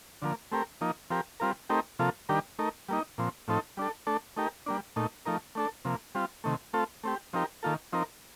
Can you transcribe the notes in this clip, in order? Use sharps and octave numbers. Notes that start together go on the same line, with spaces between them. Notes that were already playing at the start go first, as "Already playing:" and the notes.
D3 F3 A#3
A3 C4 G4 A#4
F3 A#3 D#4
F3 C4 G4 A#4
G3 C4 F4 A#4
A3 C4 D#4 G4 A#4
C3 F3 A#3 F4 A4
D#3 G3 D4 G4 A#4
A3 D#4 A#4
G3 A#3 D#4
A#2 F3 C4
A2 F3 C4 D#4 A4
G3 D4 A4
A3 D4 A4
A3 D#4 G4 A#4
G3 A#3 D4
A#2 A3 D#4
F3 A3 D#4 A#4
A3 D4 A4
C3 F3 A#3
G3 C4 F4
C3 D#3 A3
A3 C4 F4 A4
A3 C4 G4
F3 C4 D#4 G4 A#4
D#3 A#3 F4 A4
F3 C4 D#4 A#4